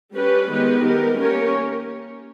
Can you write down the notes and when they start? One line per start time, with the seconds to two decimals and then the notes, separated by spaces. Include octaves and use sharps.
0.15 G3 C#4 G4 B4
0.49 D#3 G#3 B3 G4 B4
0.83 G3 B3 G4 A#4
1.17 A#3 C#4 G4 A#4 C#5